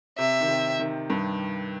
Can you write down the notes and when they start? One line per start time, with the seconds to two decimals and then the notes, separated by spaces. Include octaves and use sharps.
0.18 C3 E5
0.40 D#3
0.48 C3
0.79 D#3
1.10 G2